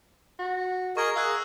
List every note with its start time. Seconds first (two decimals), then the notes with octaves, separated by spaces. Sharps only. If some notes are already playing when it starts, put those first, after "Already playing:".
0.39 F#4
0.97 G#4 A#4 D#5 C#6 G#6
1.16 G#4 F5 D#6 E6 F#6